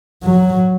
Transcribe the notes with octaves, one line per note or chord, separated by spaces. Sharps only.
F#3